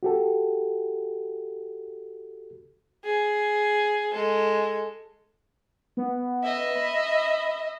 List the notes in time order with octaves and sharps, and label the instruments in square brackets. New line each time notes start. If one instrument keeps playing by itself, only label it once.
[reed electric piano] F#4 G4 A4
[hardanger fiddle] G#4
G#3 A4
[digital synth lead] B3
[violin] D#5 E5
[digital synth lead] B5